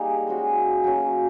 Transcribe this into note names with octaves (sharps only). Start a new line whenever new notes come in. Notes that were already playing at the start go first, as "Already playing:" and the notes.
Already playing: G3 A#3 D#4 G#4
G#3 C#4 F#4
F#3 A#3 C#4